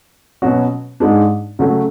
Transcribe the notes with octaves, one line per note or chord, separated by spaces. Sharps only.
B2 F#3 C#4 F#4
G#2 G#3 D4
C#3 F#3 A3